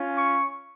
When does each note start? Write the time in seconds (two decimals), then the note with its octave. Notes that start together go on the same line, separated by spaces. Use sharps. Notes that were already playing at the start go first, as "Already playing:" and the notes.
Already playing: C#4 F4
0.16 C#6